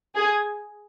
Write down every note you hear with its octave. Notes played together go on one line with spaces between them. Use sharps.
G#4